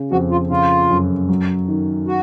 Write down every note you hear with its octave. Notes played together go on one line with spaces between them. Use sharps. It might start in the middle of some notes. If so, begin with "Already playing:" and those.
Already playing: C#3
F2 F#4
F4
C#3 F4
F#2
F#3
D#3
F#4